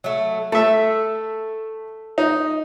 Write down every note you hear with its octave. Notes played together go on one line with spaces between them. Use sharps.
F#3 A3
A3 A4 E5
D#4